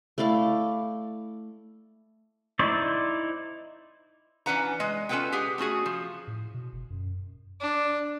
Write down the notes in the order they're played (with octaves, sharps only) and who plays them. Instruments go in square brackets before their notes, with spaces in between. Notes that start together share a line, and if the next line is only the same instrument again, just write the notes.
[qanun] A3 E4 D5 F5
[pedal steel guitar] D#4 E4 C5 D5
[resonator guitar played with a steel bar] E3 C#4 D4 B4 F#5 A#5
G#3 D#5
C#4 F4 A4 B4 F#5 G5
G4 G#4 F#5
A3 C#4 F#4 G#4
F3
[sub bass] A2
B2
F#1
F#2
[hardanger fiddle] D4